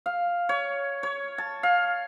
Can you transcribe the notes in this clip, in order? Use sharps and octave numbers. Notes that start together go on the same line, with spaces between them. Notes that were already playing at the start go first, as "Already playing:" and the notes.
F5
C#5
C#5
A5
F5